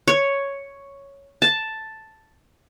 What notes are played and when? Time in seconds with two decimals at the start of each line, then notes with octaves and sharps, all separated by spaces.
0.08 C#5
1.42 A5